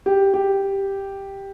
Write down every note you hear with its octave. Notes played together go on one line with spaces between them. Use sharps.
G4
G4